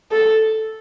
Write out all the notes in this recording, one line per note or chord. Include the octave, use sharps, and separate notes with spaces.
A4